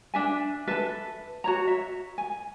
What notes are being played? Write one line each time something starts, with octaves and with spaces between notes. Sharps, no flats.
D4 E5 G#5
A4 B4 E5 A5
F#4 C#5 A#5
E5
G#5